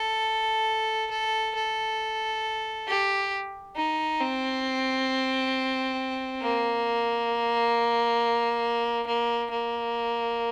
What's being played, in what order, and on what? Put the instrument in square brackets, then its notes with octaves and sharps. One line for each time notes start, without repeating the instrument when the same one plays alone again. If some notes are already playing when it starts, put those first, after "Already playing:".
Already playing: [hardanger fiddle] A4
A4
A4
G4
D#4
C4
A#3
A#3
A#3